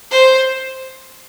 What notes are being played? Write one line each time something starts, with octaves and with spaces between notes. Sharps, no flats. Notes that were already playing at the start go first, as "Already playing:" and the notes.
C5